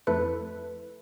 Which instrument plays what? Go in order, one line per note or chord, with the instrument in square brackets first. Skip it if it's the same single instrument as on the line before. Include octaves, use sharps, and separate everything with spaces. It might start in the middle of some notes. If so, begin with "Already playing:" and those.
[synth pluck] F2 A3 E4 A4 B4 C#7